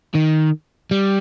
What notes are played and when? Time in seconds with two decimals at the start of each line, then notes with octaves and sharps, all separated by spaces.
0.14 D#3
0.91 G3